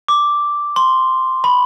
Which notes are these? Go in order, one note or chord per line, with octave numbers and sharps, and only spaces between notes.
D6
C6
B5